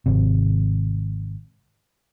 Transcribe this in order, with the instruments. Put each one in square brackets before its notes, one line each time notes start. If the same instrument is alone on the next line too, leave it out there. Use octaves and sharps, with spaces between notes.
[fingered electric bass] G#1 C3